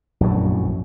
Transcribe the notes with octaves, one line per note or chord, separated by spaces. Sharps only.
A#1 F#2 A2 F#3